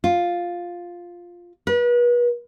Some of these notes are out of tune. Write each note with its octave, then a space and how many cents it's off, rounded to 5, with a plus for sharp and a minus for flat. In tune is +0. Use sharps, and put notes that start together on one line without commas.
F4 +5
B4 -35